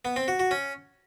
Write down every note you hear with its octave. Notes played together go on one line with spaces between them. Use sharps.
B3
C4
F#4
F#4
C#4